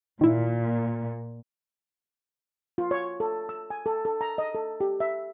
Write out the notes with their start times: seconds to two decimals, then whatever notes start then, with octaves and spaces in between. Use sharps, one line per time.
0.21 A#2 D#3 E4
2.78 F4
2.91 C#5
3.20 A4
3.49 E6
3.70 G#5
3.86 A4
4.05 A4
4.21 A#5
4.38 D#5
4.55 A4
4.81 G4
5.00 E5